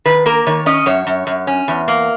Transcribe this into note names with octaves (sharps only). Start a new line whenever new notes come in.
D#3 B4
A#3 A#4
D#3 C#5
C#4 D#5
F#2 C#5
F#2
F#2
C#4
E2
A#3